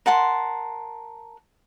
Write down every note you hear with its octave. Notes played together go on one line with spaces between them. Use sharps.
A#4 F#5 A5 C6